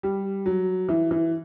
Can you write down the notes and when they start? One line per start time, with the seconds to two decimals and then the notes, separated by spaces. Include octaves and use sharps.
0.03 G3
0.46 F#3
0.89 E3
1.11 E3